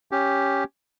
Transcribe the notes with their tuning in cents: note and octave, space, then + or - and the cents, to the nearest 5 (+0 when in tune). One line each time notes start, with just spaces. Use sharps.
C#4 +0 G4 +0